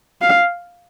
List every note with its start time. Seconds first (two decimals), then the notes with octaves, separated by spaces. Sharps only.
0.22 F5